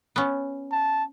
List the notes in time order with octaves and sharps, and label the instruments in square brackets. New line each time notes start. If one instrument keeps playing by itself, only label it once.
[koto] B3 C#4
[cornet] A5